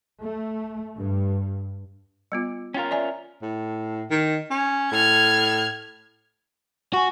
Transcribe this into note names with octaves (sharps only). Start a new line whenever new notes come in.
A3
G2
G3 B3 F4
C#4 F4 A#4 F5 G5
D5 E5 G#5
A2
D#3
C#4
A2 F6 G#6
F#4 G#5 C#6